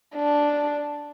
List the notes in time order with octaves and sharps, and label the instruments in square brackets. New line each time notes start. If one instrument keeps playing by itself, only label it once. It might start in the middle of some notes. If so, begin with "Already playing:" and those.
[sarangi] D4